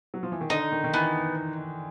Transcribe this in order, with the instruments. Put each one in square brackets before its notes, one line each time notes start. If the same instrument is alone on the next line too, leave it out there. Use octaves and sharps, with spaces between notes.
[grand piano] F#3
F3
E3
D#3
[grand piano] D3 [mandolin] D#4
[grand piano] D#3
D#3
[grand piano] E3 [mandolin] B3